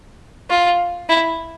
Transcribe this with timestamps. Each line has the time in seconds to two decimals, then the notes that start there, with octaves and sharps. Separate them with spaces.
0.50 F4
1.09 E4